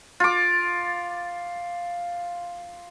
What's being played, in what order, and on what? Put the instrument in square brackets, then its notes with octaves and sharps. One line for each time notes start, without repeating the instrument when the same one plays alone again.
[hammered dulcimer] F4 D6